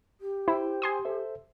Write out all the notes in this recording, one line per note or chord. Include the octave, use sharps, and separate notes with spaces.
G4
E4 C5 G5
G#5 C6 D#6
A4 C5 E5